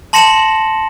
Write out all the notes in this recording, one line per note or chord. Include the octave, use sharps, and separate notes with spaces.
A5 C6 A#6 C#7 E7 F#7